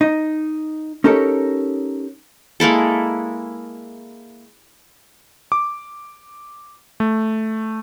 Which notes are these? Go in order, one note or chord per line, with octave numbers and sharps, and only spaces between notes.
D#4
C#4 D#4 G4 A4 A#4 C#5
G#3 A#3 E4 A4
D6
A3